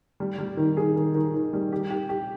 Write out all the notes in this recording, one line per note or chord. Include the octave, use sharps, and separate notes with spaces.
G3
G3
D#3
G#4
D#3
D#3
D#3
G3
G4
G4
G4